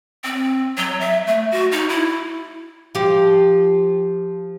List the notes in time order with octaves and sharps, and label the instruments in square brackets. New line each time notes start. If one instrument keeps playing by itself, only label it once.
[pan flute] C4
F#3
E5
A3
F#4
D#4
E4
[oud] F3 G4